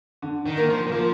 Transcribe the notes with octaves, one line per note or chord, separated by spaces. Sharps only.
D3
D#3
A#3
F3
D#3
F3 A#3